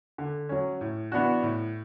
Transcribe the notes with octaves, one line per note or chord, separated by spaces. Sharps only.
D3
F#3 C#4
A2
E3 B3 D4 F#4
A2